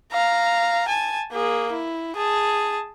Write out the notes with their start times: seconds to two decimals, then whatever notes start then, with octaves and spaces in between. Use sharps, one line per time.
0.12 F5 A#5
0.88 G#5 A5
1.33 A#3 G#4
1.73 E4
2.17 G#4 A5